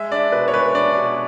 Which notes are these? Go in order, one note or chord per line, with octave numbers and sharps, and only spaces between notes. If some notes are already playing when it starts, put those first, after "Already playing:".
Already playing: G#3 E5
D4 D5
B2 B4
C#5
G#3 B4
D4 D5
B2